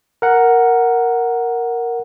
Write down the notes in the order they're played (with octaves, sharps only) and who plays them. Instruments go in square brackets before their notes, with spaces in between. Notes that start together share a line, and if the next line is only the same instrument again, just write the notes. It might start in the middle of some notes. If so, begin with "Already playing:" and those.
[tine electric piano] A#4 F#5